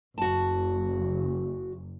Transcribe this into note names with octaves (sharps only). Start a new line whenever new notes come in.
F#1 F#4 A5